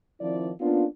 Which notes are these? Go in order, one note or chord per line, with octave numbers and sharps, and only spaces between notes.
D#3 F3 C4 E4 D5
A#3 B3 C#4 D4 F4